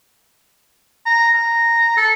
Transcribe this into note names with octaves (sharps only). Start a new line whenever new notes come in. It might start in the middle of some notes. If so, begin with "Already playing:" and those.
A#5
A#5
A4